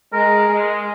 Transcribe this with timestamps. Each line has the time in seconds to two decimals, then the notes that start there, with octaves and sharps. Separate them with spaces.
0.12 G#3 A#4
0.49 G#3